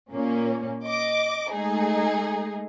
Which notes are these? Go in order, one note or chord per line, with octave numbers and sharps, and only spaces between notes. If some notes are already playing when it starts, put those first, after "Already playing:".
A#2 A#3 C#4
D#5 D6
G#3 A3 D#4 G#4